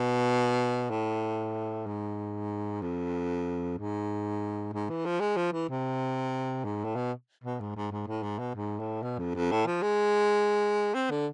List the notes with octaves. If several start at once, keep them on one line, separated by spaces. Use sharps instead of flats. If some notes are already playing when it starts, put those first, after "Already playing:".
Already playing: B2
A2
G#2
F2
G#2
G#2
E3
F3
G#3
F3
E3
C3
G#2
A2
B2
B2
G#2
G#2
G#2
A2
G#2
B2
G#2
A2
B2
F2
F2
A2
F3
G#3
C4
D3